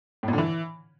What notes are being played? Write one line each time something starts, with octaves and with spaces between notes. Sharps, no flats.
A2
A#2
D3
E3